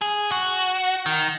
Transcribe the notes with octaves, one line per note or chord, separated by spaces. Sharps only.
G#4
F#4
D#3